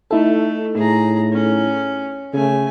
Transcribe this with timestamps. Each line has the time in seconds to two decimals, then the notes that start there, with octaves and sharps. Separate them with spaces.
0.11 A3 D#4 E4 A4
0.77 A2 G#4 A#5
1.32 C#4
2.33 C#3 A3 G#5